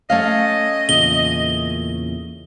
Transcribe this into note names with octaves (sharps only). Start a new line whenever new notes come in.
A3 C#4 D#5 F5
E2 A#2 C#3 G7